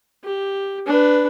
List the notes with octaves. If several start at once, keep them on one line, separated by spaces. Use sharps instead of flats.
G4
D4 B4